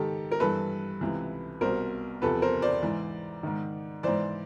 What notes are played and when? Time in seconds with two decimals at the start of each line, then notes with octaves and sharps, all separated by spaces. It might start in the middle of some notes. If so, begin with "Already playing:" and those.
Already playing: G#2 D#3 G4 A4
0.31 A#4
0.40 G2 E3 A4 B4
1.01 C#2 C3 E3
1.61 C2 B2 A#4 C5
2.22 E2 C3 F3 A4 B4
2.42 A#4 C5
2.62 C5 D5
2.83 G#2 E3
3.43 G#2 D#3
4.03 G#2 E3 C5 D5